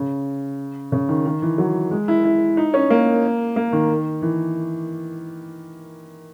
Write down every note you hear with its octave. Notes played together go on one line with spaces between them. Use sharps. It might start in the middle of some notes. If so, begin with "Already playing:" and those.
Already playing: C#3
C#3
D#3
D#3
E3
F#3
G#3
E4
E4
D#4
C#4
A#3
A#3
D#3
E3